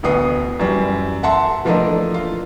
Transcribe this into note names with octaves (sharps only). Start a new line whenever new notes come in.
A1 D2 B3 D#6 C7
F#2 E3 G3
E5 F#5 A5 C6
E3 F3 A3 A#3 D4 D#5
F4